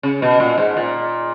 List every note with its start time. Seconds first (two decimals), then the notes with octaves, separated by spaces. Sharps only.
0.03 C#3
0.22 B2
0.40 A#2
0.58 G#2
0.77 A#2